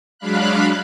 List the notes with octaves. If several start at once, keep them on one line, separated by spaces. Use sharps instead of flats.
F#3 G#3 D4 F5 B5 F#6